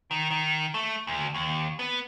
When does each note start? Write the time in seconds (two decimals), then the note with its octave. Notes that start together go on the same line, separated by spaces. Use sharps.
0.11 D#3
0.31 D#3
0.74 A3
1.07 D2
1.34 D#2
1.79 B3